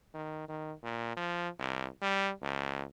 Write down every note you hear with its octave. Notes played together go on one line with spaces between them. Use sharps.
D#3
D#3
A#2
F3
C2
G3
C#2